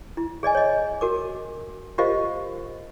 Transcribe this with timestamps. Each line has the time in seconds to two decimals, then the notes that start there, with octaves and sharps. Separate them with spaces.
0.17 E4
0.43 G#4 D5 D#5 G#5
0.55 C#5 D#5
1.01 F#4 A#4 D6
1.98 F4 G4 A#4 C5 D#5 F5